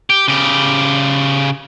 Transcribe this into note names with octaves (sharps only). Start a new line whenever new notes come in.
G4
C#3 G4